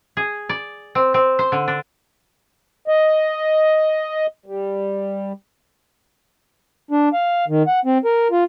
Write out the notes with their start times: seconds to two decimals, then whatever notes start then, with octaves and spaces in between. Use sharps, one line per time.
0.17 G#4
0.49 D5
0.95 C4
1.14 C4
1.39 C5
1.52 D3
1.68 D4
2.88 D#5
4.46 G3
6.91 D4
7.13 F5
7.48 D#3
7.67 F#5
7.85 C4
8.05 A#4
8.31 F4